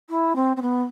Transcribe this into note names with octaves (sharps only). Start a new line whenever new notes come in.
E4
C4
C4
B3